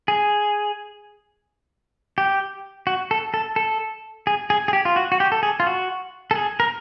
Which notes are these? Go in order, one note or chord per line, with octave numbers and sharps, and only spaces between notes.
G#4
G4
F#4
A4
A4
A4
G#4
G#4
G#4
G4
F4
F#4
F#4
G4
A4
G#4
F4
F#4
A4
G#4
A#4